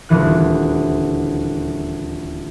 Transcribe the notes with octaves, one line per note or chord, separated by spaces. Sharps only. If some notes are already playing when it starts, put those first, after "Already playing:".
D#1 D2 E3 F#6